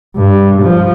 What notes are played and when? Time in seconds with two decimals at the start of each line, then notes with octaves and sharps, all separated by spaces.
0.16 G2
0.63 F3